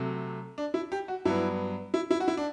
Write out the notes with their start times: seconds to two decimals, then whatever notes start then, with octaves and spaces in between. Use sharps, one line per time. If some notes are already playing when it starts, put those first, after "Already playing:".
Already playing: C3 F#3 A3
0.58 D4
0.74 E4
0.92 G4
1.08 F#4
1.25 G2 F#3 B3 E4
1.94 E4
2.11 E4
2.20 F#4
2.28 E4
2.37 D4